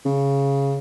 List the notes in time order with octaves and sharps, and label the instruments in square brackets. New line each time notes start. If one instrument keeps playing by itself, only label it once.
[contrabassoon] C#3